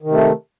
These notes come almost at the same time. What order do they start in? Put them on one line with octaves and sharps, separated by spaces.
D#3 C3 A3